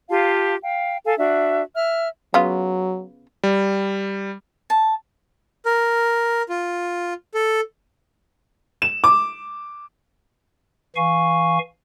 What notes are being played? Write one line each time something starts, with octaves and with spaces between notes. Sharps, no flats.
F4 G4 F5 A5
F5 G5
A4 F5 G#5
D4 F#4 E5
E5 F6
C#3 F#3 B3 F4
G3
A5
A#4
F4
A4
E7
D6
E3 F5 G#5 C#6